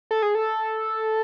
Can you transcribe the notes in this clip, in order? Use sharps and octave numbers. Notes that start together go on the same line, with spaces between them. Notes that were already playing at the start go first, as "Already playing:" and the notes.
A4
G#4
A4